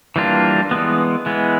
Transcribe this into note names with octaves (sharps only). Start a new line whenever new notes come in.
E3 G3 A#3 D4 F4
E3 G#3 B3
E3 G#3 B3